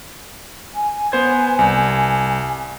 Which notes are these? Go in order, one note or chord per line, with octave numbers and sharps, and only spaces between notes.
G#5
B3 C5 G#6
C2